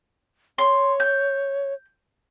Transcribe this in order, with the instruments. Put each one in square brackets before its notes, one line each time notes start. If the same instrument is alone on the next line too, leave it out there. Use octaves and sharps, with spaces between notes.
[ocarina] C#5 [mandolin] C6
[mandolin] G6